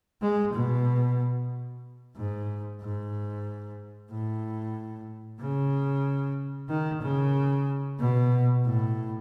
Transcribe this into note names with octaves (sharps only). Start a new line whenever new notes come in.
G#3
B2
G#2
G#2
A2
C#3
D#3
C#3
B2
A2